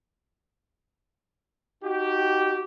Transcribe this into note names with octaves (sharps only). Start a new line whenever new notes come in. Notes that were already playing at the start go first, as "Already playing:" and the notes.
D#4 F#4 G4